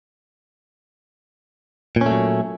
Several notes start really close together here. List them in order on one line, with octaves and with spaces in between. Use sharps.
A#2 C#4 A3 F#3